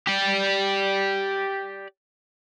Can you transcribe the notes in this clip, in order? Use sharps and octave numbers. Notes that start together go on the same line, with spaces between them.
G4 D5